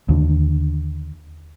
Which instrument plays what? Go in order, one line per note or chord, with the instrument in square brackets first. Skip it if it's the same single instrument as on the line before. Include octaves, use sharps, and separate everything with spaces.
[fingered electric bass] D#2 D3